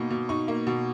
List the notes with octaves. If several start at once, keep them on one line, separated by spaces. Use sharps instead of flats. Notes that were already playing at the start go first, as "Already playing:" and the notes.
Already playing: B2 A#3 D#4
B2
D#4 C#6
A#3
B2